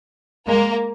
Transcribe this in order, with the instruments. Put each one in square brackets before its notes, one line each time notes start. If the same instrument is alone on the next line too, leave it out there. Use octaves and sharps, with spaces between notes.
[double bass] G#3 [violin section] A#3 A#4